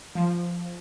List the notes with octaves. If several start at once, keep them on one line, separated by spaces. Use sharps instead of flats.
F3